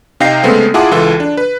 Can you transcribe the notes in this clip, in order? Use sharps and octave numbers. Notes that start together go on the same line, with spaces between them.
C3 D#4 F5 G5 A#6 C7
C#3 G#3 A3 B3 C4 A4
E4 F4 G#4 F#5 A5 D6
C#2 E3 F4 A4
D4
B4